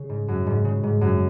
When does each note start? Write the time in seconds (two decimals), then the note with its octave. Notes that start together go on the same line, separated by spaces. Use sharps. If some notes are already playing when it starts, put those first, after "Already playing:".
Already playing: C#3
0.09 G#2
0.28 F#2
0.46 G#2
0.65 C#3
0.83 G#2
1.01 F#2